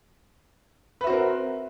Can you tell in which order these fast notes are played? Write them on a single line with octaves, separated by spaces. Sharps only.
B4 E5 F#4 C4 A#4